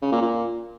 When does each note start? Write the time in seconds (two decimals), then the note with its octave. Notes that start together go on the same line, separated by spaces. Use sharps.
0.02 C#3
0.12 A#2
0.22 A#2